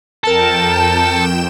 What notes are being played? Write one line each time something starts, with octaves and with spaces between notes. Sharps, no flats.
F2 A4 A#4 G5 A5 E7